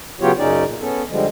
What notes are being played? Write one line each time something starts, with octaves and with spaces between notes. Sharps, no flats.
C#3 F#3 B3 F4 G4 C#5
F#2 C#3 C#4 D#4 D5
A#2
B3 C#4 A4
D3 F3 G3 G#3